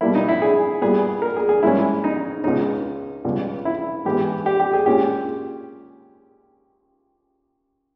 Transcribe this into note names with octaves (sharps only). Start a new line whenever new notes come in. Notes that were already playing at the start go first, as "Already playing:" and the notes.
B2 G3 A#3 E4
D#4
E4
G#4
A#2 G3 B3 G#4
A#4
G#4
G#4
G#2 G3 A#3 C#4 E4
D#4
C#2 B2 G#3 C#4 D#4
C#2 B2 G3
E4
G#2 E3 G#3 B3 G4
G4
G4
G#4
A#2 G#3 C#4 G4